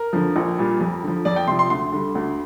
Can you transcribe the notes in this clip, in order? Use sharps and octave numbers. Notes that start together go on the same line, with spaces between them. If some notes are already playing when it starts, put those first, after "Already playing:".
Already playing: A#4
F2 D3 F3
A#1
A#2 G3
F2
D3 F3
F2 D5
G5
C3 F3 C6
C6
D2 C6
D3 G3
D2